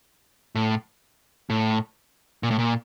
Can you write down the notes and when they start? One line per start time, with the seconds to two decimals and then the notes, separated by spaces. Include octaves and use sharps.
0.55 A2
1.50 A2
2.43 A#2
2.51 A2
2.59 A#2